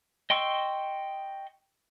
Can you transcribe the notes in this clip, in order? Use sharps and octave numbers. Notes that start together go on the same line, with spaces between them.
D#5 G5 C6 C#6 E6